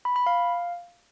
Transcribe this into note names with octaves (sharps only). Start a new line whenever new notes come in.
B5
B5
F5